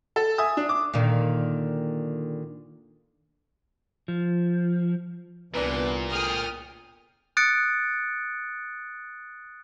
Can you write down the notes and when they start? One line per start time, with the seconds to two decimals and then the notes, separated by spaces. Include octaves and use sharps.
0.16 A4
0.38 E5 G#5 D#6
0.57 D4
0.69 D6
0.94 A#2 D3 D#3
4.08 F3
5.55 C2 A#2 E3 B3 D4 B4
6.11 D2 G#4 G5 D#6 F6
7.37 D#6 F#6 A6 C#7 D7